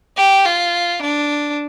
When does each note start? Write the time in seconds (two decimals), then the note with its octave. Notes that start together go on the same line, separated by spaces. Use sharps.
0.17 G4
0.45 F4
1.02 D4